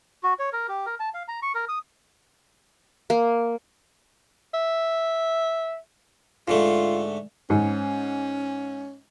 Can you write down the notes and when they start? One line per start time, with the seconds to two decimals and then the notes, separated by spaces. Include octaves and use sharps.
0.23 F#4
0.39 C#5
0.53 A#4
0.68 G4
0.86 A#4
1.00 A5
1.14 F5
1.28 A#5
1.42 C#6
1.55 A#4
1.69 D#6
3.10 A#3
4.54 E5
6.48 G#2 D3 A3 F4
7.50 G#2 C#4